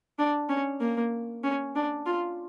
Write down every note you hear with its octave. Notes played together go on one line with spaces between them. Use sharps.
D4
C#4
A#3
C#4
D4
F4